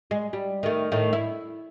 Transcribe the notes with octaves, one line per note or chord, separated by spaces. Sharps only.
G#3
G3
D#3 A3
A2 D#3 A3
E4